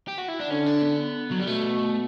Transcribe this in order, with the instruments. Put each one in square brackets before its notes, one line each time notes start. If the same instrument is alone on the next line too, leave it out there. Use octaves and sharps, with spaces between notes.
[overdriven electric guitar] G4
F#4
E4
D4
[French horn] D3 [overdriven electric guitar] C#4
[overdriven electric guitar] D4
B3
F#3
G3
[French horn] B2 [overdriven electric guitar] A3